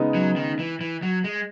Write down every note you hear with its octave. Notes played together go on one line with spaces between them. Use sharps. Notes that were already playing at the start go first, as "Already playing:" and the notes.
Already playing: C#3 G#3 B3 D#4
F#3
D#3
E3
E3
F#3
G#3